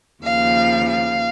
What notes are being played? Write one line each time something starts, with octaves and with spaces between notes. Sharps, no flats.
D#2 C#3 F3 F5
F5